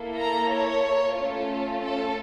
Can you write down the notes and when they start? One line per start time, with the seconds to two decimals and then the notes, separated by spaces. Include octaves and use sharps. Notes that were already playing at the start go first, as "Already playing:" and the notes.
Already playing: A#3 E4 A4
0.17 A#5
0.50 C#5
1.16 A3 C#4 F4 A4
1.81 A4